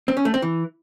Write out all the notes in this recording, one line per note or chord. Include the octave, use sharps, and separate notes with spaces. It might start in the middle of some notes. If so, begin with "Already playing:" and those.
C4
C#4
A3
C4
E3